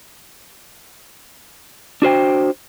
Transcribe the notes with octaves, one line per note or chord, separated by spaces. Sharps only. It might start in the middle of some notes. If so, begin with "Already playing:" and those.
D4 F#4 C5 G5